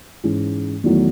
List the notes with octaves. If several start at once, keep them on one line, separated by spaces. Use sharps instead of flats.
G#2 E3 G#3 C#4
E2 D#3 F#3 A3 D#4